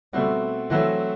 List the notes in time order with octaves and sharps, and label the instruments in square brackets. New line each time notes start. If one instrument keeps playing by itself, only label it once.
[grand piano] B2 A3 C4 F#4 [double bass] G3
[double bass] E3 [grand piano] F#3 A3 C4 F#4